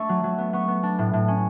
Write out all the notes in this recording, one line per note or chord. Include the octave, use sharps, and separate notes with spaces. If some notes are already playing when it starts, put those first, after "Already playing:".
Already playing: A3 D4 C#6
F#3
F#3
B3
B3 C#6
B3
D4
A2
A2
C#4